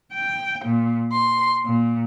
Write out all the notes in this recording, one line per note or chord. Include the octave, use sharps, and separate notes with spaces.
G5
A#2
C6
A#2